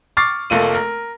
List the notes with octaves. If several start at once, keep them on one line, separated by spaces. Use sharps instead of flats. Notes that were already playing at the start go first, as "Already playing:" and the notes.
C#6 D6 F6 A6 C7
F1 A3 A#3 F4 D#7
A#4